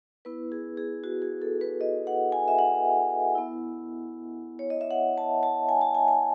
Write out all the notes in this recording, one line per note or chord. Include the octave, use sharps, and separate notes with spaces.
B3 E4 B4
G#4
G#4
F#4
G#4
A4
B4
D#5
F#5
G#5
E5
F#5
B3 E4
C#5
D#5
E5
F#5
A5
A5
G#5
A5
G#5
A5